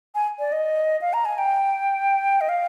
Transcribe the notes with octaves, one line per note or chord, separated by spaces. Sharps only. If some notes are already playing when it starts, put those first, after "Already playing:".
G#5
D5
D#5
F5
A#5
G#5
G5
D#5
F5